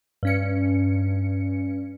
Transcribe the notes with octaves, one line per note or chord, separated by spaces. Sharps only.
G2 C#4 C#7